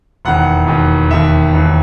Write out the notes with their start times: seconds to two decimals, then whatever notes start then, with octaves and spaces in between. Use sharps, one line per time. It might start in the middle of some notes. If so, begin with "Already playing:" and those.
0.25 E1 D#2 D#3 F#5
0.67 E1 D#2 D#3
1.10 E1 D#2 D#3 E5
1.53 E1 D#2 D#3